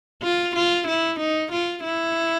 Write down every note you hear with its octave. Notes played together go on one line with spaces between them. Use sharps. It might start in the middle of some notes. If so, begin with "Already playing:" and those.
F4
F4
E4
D#4
F4
E4